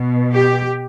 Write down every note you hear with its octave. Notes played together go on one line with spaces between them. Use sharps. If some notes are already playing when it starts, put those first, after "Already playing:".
Already playing: B2
G4